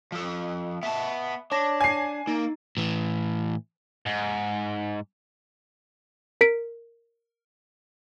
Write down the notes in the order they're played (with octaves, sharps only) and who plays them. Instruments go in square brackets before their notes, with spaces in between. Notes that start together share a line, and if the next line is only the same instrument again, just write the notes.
[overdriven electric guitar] F3 A4
[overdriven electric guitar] B3 A5 [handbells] E5
[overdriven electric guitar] D4 [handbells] C#5 A5 A#6
[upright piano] G#5 C7
[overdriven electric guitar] A#3 [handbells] D#4
[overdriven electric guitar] A2 E3
G#2
[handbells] A#4 B6 D7